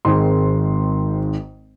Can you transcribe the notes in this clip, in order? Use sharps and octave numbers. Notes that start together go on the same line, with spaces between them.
G#1 G#2 D#3 G#3 C4 C6